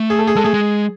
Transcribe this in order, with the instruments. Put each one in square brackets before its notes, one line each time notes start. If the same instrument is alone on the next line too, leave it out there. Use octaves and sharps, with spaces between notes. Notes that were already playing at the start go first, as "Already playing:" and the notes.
Already playing: [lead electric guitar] A3
[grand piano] G#4
A4
G#4
[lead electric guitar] G#3 [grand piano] A4
[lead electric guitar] A3 [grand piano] G#4
[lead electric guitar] G#3